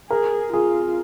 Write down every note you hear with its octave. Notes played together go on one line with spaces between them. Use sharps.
G#4 A#4
F4 G#4